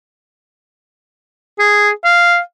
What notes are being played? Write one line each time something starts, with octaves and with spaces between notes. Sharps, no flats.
G#4
F5